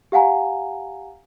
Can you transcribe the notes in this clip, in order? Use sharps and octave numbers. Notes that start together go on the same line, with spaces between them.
G4 F5 F#5 G#5 A#5